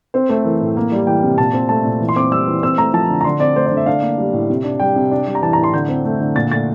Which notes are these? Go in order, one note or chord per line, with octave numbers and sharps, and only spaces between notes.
C4 C5
A3 C5
E3 A#4
A2
A#3
G3
E3 G5
C3
A#2 A5
C4
A3 A5
A#2
E3
C6
C4 D6
G3 E6
E3
C4 E6
A3 A#5
F3 A5
D3
A#5
D3 C6
C4 D5
A3 C5
D5
D3
E5
D4 F5
A#3
G3
A2
C3
D4
G3 G5
C3
D4
G3
A#5
E3 A5
A2 A#5
C6
D3 G6
C4
A3
D3
A#2 A6
A3 A6